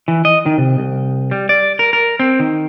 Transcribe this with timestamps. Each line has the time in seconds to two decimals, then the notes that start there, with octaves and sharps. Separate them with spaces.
0.08 E3
0.25 D#5
0.46 D#3
0.58 C3
0.78 C2
1.31 G3
1.49 D5
1.79 A#4
1.93 A#4
2.19 C4
2.39 D#3